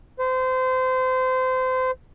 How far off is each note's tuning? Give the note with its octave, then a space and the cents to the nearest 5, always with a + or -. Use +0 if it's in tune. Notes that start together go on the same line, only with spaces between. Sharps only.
C5 -25